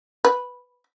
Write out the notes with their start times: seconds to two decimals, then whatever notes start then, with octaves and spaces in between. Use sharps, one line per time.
0.25 B4